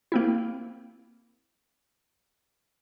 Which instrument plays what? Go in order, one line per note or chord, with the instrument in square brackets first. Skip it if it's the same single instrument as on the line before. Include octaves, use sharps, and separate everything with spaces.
[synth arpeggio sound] A#3 C4 E4